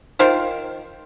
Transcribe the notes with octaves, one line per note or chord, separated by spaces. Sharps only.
D#3 F4 A#4 C5